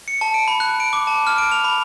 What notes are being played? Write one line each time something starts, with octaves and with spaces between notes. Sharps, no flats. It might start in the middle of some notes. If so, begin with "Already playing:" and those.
C#7
A5
D7
B5
F#6
D7
D6
A5
F6
D7
F7
B5